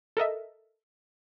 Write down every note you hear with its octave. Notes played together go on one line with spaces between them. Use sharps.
A4 A#4 D#5 E5